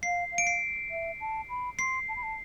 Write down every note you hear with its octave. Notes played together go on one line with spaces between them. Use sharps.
F5 C7
F5
D7
C7
E5
A5
B5
C6 C7
A5
B5
A5